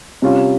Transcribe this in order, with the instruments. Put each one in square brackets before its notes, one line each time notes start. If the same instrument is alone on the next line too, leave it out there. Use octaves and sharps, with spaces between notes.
[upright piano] C3 G3 C#4 F4